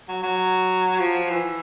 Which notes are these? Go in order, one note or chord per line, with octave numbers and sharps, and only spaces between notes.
F#3
F#3
F3
E3